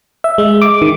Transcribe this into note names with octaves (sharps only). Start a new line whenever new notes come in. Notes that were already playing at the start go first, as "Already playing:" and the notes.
E5
G#3
D6
D#3